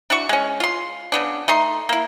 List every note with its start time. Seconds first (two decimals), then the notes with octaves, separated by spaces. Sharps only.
0.10 D4 E4 F#4 C#6
0.29 G#3 C#4
0.60 F4 C6
1.12 C#3 B3 D4
1.48 A3 D#4 C6
1.89 A#3 E4